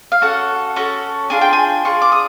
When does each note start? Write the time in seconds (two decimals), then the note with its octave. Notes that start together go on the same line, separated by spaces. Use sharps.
0.12 F5
0.21 C#4 F#4 A4 F#5
0.76 C#4 F#4 A4
1.30 D4 F4 G#4 G#5
1.41 G5
1.53 G#5
1.84 D4 F4 G#4 C#6
2.02 D6
2.12 D#6